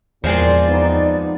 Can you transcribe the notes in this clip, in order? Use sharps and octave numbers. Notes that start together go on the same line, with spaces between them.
E2 A#2 F3 G#3 C4 D5
B3 D#4